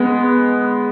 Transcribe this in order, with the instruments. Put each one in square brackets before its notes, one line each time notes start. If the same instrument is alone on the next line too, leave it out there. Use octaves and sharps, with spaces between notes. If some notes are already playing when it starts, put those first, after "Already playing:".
Already playing: [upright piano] G#3 B3